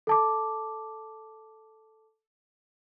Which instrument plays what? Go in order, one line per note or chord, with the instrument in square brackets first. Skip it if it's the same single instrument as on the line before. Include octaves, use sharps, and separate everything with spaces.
[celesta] A4 A5 D6